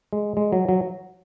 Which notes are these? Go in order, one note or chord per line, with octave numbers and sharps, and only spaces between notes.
G#3
G#3
F#3
F#3